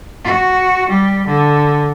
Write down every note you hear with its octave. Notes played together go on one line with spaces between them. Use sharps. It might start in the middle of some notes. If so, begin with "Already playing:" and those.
F#4
G3
D3